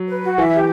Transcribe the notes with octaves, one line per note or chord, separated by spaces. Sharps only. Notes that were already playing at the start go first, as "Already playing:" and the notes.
Already playing: F#3
B4
F#4
E3 E5
G4